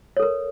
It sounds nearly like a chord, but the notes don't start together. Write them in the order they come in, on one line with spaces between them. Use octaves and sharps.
C#5 A4 A#4